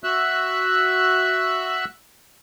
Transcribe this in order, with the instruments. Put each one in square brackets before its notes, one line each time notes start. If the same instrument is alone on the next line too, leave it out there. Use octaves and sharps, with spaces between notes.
[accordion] F#4 E5 E6 F#6